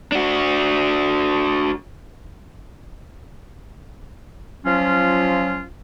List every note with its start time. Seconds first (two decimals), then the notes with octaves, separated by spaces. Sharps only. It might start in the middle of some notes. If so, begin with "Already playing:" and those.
0.12 D4 F#4
4.65 F3 F#3 C#4 F4